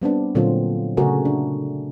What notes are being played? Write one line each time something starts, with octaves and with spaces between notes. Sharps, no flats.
G3 B3 C4 D4
A#2 D3 F#3 A#3 C4 F4
C#3 A3 F#4 G#4 A#4
D4